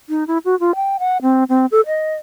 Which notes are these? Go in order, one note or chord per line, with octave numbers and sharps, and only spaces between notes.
D#4
E4
F#4
F4
G5
F#5
C4
C4
A4
D#5